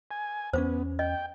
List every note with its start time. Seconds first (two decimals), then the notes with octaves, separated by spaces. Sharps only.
0.11 G#5
0.53 E2 B3 C#4 C5 D6
0.99 D#5 G5